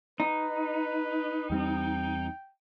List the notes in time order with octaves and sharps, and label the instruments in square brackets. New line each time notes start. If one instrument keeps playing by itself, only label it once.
[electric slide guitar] D#4 [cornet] B4
[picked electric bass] E2 G3 C4 [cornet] G5